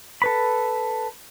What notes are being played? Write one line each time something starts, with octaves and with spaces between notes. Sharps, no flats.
A4 B4 B5